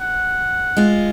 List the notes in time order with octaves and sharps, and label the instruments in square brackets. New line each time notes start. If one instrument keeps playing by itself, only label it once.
[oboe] F#5
[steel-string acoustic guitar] G#3 F4